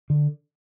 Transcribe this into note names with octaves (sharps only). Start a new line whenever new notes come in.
D3